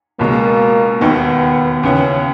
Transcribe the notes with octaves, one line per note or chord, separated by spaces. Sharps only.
C#2 B2 G#3 A#3
E1 D#2 D#3 B3
D#2 C#3 E3 B3 C#4